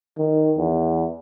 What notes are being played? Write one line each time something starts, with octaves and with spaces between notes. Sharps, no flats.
D#3
E2